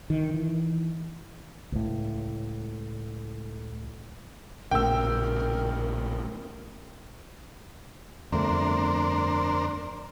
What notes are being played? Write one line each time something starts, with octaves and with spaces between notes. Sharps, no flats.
D#3
E3
C#2 A2
A#1 A2 C#3 A#4 G5 E6
G1 F2 A3 D4 A#4 C5